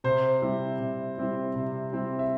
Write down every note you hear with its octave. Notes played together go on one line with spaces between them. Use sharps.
C3 C5
G3 C4 E4
C3
G3 C4 E4
C3
G3 C4 E4
E5